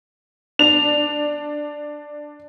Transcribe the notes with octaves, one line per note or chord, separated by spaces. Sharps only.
D4 F7